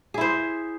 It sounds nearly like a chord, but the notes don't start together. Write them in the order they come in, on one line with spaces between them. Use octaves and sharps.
G#4 E4 C5